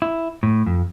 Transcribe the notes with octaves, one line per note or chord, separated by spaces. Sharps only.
E4
A2
F2